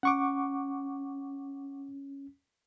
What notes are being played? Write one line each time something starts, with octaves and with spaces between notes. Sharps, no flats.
C#4 F#5 C#6 D6